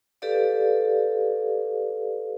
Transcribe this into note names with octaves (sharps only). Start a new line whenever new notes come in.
G4 A4 B4 D5 F5